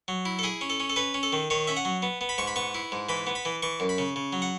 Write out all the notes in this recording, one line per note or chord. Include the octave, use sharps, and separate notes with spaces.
F#3
E4
A4
E4 G#4
C#4
A4
C#4
A4
C#4 B4
C#4
A4
D#3
D#3 C#5
C#4 E5
F#5
F#3
B3
B3
B5
G#2 C#6
B5
B3 C#6
E4
G#2
E3 B5
B3
B5
E3
E3 C#6
F#2
B5
C#3
C#3
F#3
F#5